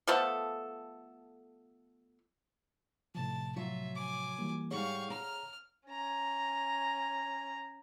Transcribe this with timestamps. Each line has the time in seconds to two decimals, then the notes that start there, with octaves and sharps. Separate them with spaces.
0.07 F3 A3 B3 A4
3.15 A2 C3 F3 A5
3.56 F#3 F4 E5
3.95 G#5 D6
4.39 E3 G3 A#3
4.71 G#2 G3 G#4 C#5 F5 C#6
5.10 A#5 F6
5.87 C#4 A#5